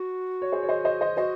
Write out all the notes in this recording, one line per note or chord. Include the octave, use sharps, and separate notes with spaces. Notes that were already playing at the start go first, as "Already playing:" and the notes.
Already playing: F#4
C#5
G#4 C5
C#5
C5 D#5
C5 D#5
C5 D#5
F#4 C5 D#5